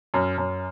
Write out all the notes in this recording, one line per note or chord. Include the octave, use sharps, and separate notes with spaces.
F#2
F#2